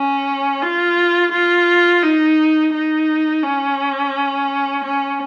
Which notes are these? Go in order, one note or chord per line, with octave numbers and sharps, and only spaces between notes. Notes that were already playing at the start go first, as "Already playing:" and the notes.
Already playing: C#4
F4
F4
D#4
D#4
C#4
C#4